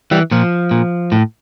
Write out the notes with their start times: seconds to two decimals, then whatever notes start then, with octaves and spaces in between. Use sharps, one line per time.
0.11 E3 G3
0.31 A#2 F3
0.71 A#2
1.12 A2